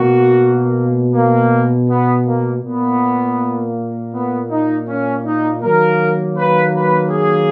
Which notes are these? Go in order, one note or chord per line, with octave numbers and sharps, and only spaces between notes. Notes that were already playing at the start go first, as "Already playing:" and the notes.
Already playing: B2 A#3 F#4
A#3
B3
A#3
A#2 A#3 B3
B3
D#4
C#4
D#4
D#3 F#3 A#3 A#4
B4
B4
G#4